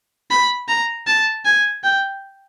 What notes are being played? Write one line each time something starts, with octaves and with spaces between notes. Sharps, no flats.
B5
A#5
A5
G#5
G5